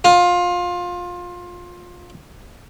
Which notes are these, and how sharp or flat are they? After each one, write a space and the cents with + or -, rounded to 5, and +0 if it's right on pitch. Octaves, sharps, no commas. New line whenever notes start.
F4 +20